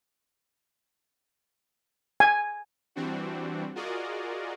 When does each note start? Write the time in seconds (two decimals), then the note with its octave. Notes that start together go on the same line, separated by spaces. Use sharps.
2.20 G#5
2.95 E3 G3 C4 D4 F#4
3.75 F4 F#4 G#4 A#4 D5 D#5